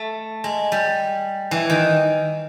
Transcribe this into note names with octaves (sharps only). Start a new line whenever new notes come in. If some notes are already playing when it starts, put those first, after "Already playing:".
Already playing: A3
G#3
G3
E3
D#3